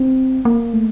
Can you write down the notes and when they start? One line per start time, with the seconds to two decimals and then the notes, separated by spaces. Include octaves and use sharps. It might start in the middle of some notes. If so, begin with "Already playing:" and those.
Already playing: C4
0.45 A#3
0.73 A3